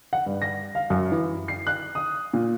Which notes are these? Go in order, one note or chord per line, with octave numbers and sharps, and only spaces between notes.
F#5
G2
A#6
F5
F#2
E3
C7
F#6
D#6
A#2